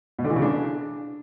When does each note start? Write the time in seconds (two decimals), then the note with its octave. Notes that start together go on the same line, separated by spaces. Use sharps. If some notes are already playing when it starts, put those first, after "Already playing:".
0.19 B2
0.24 D3
0.30 E3
0.36 C#3
0.42 D4